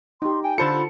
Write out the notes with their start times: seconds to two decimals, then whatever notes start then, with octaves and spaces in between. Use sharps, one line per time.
0.22 D#4 G4 C6
0.44 G5 G#5
0.58 D3 F4 A4 C5 A5 B5 C#7